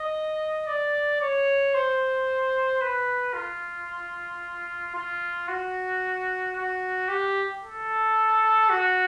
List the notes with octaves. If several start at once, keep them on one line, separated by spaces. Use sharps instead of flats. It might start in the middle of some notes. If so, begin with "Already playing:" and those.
Already playing: D#5
D5
C#5
C5
B4
F4
F4
F#4
F#4
G4
A4
F#4